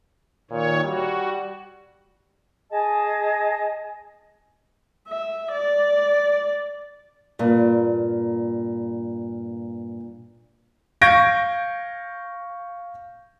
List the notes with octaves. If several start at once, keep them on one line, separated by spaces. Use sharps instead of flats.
A#2 D#3 C#5
G3 F#4
G#4 D#5 G#5 A5
E5
D5
G2 A#2
F5 C#6 G6 G#6 A#6 D7